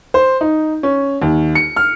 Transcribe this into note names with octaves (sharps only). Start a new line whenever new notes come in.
C5
D#4
C#4
D#2
C#7
F6